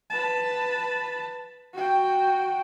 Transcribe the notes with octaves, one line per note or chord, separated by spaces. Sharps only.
B4 A5
F#4 G5